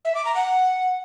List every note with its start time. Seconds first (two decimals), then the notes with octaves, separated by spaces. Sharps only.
0.05 E5
0.15 D6
0.25 A#5
0.35 F#5